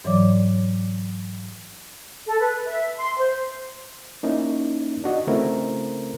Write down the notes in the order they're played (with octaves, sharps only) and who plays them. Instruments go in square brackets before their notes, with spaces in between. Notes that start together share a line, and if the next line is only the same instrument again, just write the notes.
[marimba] G#2 E3 F#3 C#5 D5 D6
[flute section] A4
B4
E5
C6
C5
[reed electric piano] A#3 C#4 D#4 E4
D4 F#4 D#5
C#3 A3 C4 E4 A#4